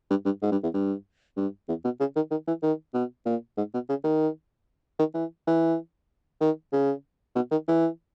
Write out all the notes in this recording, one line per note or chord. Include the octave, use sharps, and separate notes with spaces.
G2
G2
G#2
G2
E2
G2
G2
E2
B2
C#3
D#3
D#3
E3
D#3
B2
A#2
G#2
B2
C#3
D#3
D#3
E3
E3
D#3
C#3
B2
D#3
E3